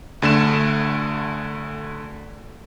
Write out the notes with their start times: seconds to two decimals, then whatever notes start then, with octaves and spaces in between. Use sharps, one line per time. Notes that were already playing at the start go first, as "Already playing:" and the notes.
0.22 D2 D3 A3 E7